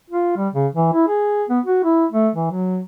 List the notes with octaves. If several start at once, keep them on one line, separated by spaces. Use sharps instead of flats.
F4
G3
C#3
E3
E4
G#4
B3
F#4
E4
A3
E3
F#3